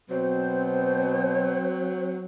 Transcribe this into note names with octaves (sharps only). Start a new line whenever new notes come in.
B2 F#3 C4 C5